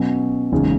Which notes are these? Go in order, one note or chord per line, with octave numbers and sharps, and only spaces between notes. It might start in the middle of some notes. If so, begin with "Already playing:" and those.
Already playing: B2 F#3 C#4
F#1 E2 C#3 G#3 D#4